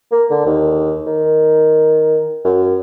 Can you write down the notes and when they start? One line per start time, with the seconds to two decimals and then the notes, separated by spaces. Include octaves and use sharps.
0.12 A#3
0.31 D3
0.46 D#2
1.07 D#3
2.44 F#2